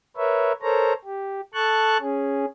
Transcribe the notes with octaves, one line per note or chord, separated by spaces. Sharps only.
A#4 B4 C#5 E5
A4 A#4 C5 C#5 A#5
G4
A4 A5 C#6 F#6
C#4 G#4